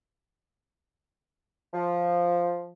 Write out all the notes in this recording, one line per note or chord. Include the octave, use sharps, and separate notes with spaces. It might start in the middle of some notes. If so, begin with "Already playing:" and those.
F3